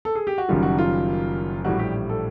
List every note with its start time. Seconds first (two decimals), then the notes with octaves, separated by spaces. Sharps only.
0.05 A4
0.15 G#4
0.27 G4
0.38 F#4
0.49 F#1 F#2 D#3 G3 F4
0.63 F#4
0.78 F4
1.65 A#1 A2 E3 G3 F#4
1.79 G4
2.09 A4